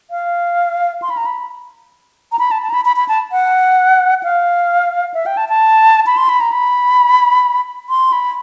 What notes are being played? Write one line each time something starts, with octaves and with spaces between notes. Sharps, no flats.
F5
C6
B5
A#5
B5
A#5
B5
A5
A5
A#5
B5
B5
B5
A5
F#5
F5
E5
G5
A5
A5
B5
C6
B5
A#5
B5
C6
B5